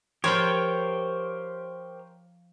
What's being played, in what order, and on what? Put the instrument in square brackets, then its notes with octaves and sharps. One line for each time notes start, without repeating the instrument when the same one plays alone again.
[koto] F3 F4 G5 [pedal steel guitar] G4 A#4 C5 [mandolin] C#5